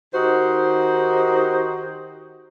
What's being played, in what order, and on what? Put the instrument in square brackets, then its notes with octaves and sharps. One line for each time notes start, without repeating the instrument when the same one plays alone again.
[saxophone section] D#3 D#4 F#4 G4 C5